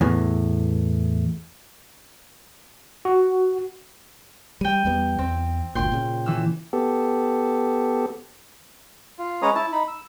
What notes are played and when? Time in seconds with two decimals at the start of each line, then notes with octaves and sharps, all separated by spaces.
0.01 E2 A2 E3
3.05 F#4
4.61 G3 G5 D#7
4.85 E2 G3 B3
5.18 E2 C4
5.75 G1 D2 A#2 G5 C6 G6
5.92 A#2 C#3
6.26 E3 E6
6.73 B3 G4 A4
9.18 F4
9.42 G#3 C#4 B4 C#5 A#5 D#6
9.55 E4 A5
9.72 D#4 B5
9.88 E6